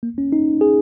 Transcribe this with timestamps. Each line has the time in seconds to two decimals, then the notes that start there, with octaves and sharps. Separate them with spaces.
0.03 A#3
0.18 C#4
0.32 D#4
0.61 G#4